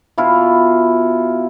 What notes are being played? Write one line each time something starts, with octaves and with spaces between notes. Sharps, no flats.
B2 E4 F4